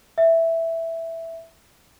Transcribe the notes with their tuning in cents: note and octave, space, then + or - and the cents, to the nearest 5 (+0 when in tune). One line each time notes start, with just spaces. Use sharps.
E5 +0